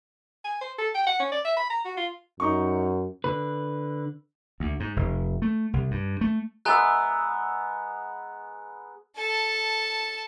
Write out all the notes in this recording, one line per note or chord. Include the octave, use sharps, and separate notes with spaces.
G#5
C5
A4
G5
F#5
C#4
D5
E5
B5
A#5
F#4
F4
F#2 D#4 C#6
D3 B4
D2
G#2
F1
A3
C2
G2
A3
G#3 B3 G#5 A#5 E6 F#6
A4 A5